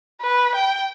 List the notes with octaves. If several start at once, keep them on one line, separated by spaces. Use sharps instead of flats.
B4
G5